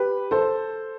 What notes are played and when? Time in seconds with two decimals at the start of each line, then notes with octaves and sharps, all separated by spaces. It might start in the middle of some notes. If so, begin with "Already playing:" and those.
Already playing: G4 B4
0.31 A4 C5